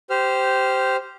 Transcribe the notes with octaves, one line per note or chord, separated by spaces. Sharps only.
G4 C5 F6